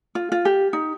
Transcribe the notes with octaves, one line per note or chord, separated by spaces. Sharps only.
F4
F4
G4
D#4